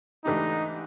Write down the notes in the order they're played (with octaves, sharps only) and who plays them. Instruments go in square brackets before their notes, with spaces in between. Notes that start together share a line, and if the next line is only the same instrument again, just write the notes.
[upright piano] G#2 E3 A3 D4 G4 [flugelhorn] D#4